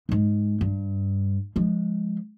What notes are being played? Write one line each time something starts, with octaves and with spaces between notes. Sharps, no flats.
G#2 G#3
G2
F3 G#3